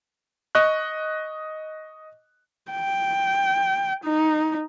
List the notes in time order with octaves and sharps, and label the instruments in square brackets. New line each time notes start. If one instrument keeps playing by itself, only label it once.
[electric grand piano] D#5 C#6 F#6
[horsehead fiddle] G5
D#4